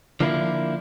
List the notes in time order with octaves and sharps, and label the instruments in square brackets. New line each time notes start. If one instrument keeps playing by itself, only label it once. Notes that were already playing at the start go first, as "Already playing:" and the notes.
[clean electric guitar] D3 F3 A#3 D4 E4